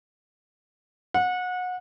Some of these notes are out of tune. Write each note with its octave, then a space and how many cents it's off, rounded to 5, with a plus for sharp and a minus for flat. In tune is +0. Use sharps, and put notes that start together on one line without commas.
F#5 -25